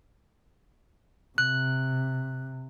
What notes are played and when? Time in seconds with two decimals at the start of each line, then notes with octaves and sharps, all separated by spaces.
1.38 C3 F#6